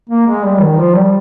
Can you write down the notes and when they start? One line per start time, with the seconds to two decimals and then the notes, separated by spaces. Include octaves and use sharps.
0.10 A#3
0.27 G#3
0.43 G3
0.60 D#3
0.77 F3
0.94 G3